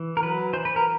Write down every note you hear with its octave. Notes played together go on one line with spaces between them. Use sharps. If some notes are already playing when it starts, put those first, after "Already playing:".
Already playing: E3
A#4
F#3 B4
E3 C5
B4
A#4